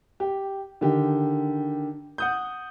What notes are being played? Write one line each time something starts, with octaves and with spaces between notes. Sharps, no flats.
G4
D3 D#3 G4
F#5 D#6 G6